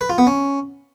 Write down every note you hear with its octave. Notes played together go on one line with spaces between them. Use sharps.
B4
F4
B3
C#4